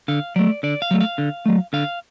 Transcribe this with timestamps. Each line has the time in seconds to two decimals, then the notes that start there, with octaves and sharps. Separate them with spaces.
0.08 D3 F5
0.36 F#3 A3 D5
0.63 D3 D5
0.82 F5
0.91 F#3 A3
1.00 F5
1.18 D3
1.46 F#3 A3
1.73 D3 F5